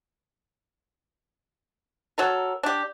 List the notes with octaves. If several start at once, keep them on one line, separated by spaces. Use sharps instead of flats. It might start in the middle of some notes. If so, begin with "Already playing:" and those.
F#3 A4 A#4
D4 G4